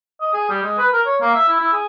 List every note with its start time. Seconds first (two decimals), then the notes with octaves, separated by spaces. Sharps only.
0.21 D#5
0.34 G#4
0.49 G3
0.63 G#3
0.78 B4
0.93 A#4
1.06 C#5
1.21 A#3
1.34 E5
1.48 E4
1.60 E4
1.73 G#4